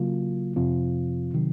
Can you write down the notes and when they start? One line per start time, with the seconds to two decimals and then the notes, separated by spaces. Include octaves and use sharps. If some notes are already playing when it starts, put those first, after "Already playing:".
Already playing: C#3 F#3 A#3 F4
0.56 F2 C3 F3 C4 F4
1.34 C3 D#3 F#3